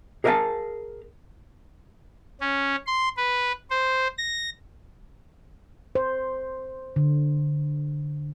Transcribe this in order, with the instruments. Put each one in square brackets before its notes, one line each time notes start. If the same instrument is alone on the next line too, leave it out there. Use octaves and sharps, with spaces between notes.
[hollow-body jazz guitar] G#4 A#4 D5 E5 F5 A5
[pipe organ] C#4
C6
B4
C5
A#6
[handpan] C5
D3